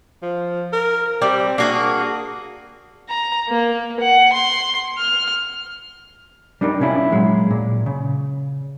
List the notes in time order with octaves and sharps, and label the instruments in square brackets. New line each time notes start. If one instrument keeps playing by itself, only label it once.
[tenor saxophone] F3
A#4
[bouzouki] G3 [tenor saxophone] C4
[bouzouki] A#3 F#4 G#4 [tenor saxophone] D4
[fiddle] A#5
A#3
F#5
C6
F6
[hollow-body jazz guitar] G3 D4 D#4 A#4
C3 C#4 D4 E4 F4
A#2 F#3 G#3
A#2
C#3